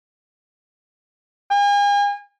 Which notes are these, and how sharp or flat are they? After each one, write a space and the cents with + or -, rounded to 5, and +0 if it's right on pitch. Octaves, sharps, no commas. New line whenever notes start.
G#5 -40